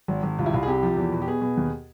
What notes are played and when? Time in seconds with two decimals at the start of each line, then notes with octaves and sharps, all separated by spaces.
0.08 G#1
0.23 G#1
0.39 C2 F4
0.46 E4
0.54 C2 F4
0.63 G#4
0.67 C3 G4
0.83 F3
0.97 E2
1.12 B2
1.22 G4
1.27 B2 G#4
1.42 B2
1.57 D#2